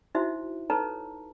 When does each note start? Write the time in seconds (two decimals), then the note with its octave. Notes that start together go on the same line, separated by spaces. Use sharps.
0.15 D#4 E4 F#4 C5 E5
0.70 D#4 A4 B4 C#5 A5 A#5